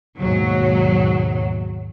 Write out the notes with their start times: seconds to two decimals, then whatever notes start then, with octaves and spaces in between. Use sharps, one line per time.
0.19 D#2 G#2 B2 F#3